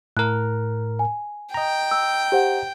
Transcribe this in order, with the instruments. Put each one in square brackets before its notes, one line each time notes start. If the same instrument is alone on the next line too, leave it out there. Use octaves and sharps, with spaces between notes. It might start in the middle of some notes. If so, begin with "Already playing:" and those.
[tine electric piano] A2 A#4 [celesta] F#6
[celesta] G#5
[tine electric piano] D#5 A#5 [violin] G5
[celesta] E6
G4 C5 F#5